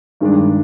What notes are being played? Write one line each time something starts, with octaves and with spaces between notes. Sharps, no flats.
G2 D#3 G#3 D4